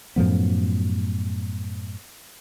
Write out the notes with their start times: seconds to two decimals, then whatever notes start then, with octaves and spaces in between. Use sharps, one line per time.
0.16 F#2 A2 F3 B3